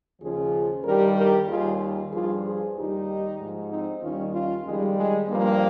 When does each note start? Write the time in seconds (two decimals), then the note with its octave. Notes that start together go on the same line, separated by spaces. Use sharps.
0.21 D#2 C#3 F3 F4 G#4
0.84 G2 D#3 G3 G4 A#4
1.16 G4 A#4
1.48 D#2 D#3 G3 F4 G#4
2.11 G2 F3 F4 G#4
2.43 F4 G#4
2.75 D#2 D#3 G3 D#4 G4
3.39 G#2 F3
3.70 C4 D#4
4.02 D#2 D#3 G3 C#4 F4
4.33 C#4 F4
4.65 F2 D#3 G3 G#3
4.97 G#3
5.28 G2 F3 G3 A#3